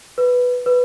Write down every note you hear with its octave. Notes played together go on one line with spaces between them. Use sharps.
B4
B4